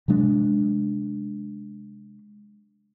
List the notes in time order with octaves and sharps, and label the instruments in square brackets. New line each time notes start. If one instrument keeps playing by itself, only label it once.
[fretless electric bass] C3 F#3 G#3 D4